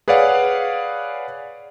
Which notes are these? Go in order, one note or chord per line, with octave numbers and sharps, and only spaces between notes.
G#4 B4 C#5 D5 F5 F#5